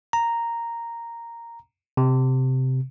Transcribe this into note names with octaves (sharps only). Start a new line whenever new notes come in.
A#5
C3